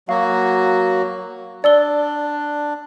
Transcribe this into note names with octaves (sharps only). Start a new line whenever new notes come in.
F#3 A#3 F#4 F5
D4 D5 E6 G7